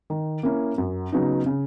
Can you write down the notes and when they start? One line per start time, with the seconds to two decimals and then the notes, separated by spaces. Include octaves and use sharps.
0.10 D#3
0.43 A#3 C#4 E4
0.78 F#2
1.12 C#3 F#3 B3 D#4
1.46 C#3